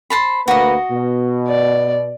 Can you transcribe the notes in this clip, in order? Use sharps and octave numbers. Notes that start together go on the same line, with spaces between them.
C5 A5 B5
D2 A#3 F#4 B4 D#5
B2
D5